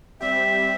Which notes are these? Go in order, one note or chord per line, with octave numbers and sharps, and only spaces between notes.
G3 C4 G4 E5